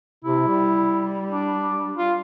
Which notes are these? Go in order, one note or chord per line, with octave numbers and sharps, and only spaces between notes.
C3 E4
G3
D4
F4